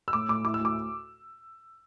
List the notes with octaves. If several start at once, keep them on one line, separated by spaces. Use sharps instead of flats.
E6
A2 D6
A2 D6
E4 D6
E6
D2
D6